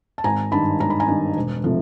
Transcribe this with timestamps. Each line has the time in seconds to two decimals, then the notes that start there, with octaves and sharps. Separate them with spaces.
0.18 A5
0.24 G#1 G#5 A#5
0.51 G2 D#3 A5 B5
0.80 G#1 A#5
0.90 B5
1.00 G#5 A#5
1.08 G2 D#3
1.36 E1
1.64 C3 F3 A3